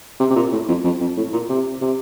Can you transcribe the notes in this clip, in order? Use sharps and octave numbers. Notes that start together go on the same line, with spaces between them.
C3
C3
A#2
A2
F2
F2
F2
A2
A#2
C3
C3